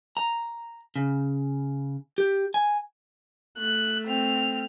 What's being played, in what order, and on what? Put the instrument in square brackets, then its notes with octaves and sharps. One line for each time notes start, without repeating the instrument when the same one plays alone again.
[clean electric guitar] A#5
C#3
G4
G#5
[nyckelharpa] A3 [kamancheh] F#6
[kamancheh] C4 [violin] F6